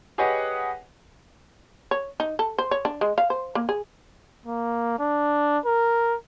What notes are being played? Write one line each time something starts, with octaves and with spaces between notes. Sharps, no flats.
G4 G#4 B4 C#5 D#5 F#5
C#5
D#4
A4
C5
C#5
D4
G#3
F5
C5
A#3
G#4
A#3
D4
A#4